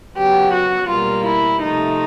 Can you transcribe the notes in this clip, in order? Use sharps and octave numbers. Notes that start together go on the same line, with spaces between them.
C#3 F#3 B3 G4
F#4
B2 G3 A#3 F4
E4
C3 F3 A3 D#4